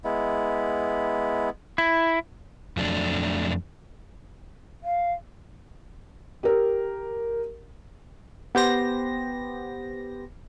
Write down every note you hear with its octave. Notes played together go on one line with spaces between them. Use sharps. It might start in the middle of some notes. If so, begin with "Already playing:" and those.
G#3 B3 E4
E4
F2 F#3 A3 D4
F5
G4 A#4
B3 G4 C5 A#6